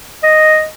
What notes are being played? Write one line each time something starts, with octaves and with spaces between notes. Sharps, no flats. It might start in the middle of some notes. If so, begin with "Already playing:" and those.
D#5